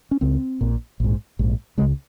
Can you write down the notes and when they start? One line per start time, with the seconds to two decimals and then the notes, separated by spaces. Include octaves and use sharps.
0.11 C#4
0.21 C#2 C#3 C4
0.61 A#1 A#2
1.00 A#1 G#2
1.39 A#1 G#2
1.78 C#3 G#3
1.81 C#2